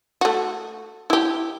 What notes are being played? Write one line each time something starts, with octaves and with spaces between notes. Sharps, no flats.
A3 F#4
E4 G4